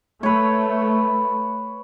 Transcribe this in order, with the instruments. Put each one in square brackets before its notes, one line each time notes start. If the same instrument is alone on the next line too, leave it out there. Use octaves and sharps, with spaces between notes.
[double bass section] A3 [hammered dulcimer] B4 C#5